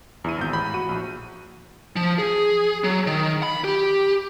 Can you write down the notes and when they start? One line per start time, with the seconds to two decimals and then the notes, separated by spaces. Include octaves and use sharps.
0.24 E2 E4 D#7
0.38 G#1 G6
0.53 A1 B5
0.74 F#4 D#7
0.89 A#1
1.96 F3
2.18 G#4
2.84 F#3
3.07 D#3
3.43 B5
3.64 G4